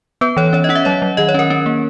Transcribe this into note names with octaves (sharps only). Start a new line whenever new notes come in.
B3 B4
E3 C#5
C#4 C#5
D#5
C#4 F#5
E5
F#3 C#5
F#3
D#3 D#5
C#5
C#4 A#4
C#4
A#3